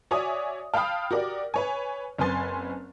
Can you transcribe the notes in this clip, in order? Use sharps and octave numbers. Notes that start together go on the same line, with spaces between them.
F#4 C#5 D5 E5 G#5 D#6
F5 G5 A5 B5 D#6 F6
F#4 G4 A#4 D5
B4 C#5 G#5
F#1 C4 B4 G#5 C6 A6